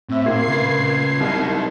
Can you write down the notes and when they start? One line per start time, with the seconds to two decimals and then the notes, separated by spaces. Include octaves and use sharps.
0.09 A2 C4 E5
0.26 A#2 G#6 C7
0.47 C#3 B4
1.20 C2 F#3 D#4